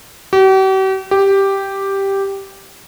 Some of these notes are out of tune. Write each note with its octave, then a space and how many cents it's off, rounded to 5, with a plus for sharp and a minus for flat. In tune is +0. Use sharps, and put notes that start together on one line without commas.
G4 -45
G4 +0